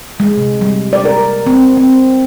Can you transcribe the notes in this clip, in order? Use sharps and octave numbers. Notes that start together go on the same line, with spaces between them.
G#3
C3
G3
D5
A#4
C4
C4